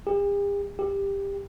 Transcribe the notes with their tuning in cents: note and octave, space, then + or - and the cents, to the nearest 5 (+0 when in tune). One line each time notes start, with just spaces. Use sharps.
G4 +45
G4 +15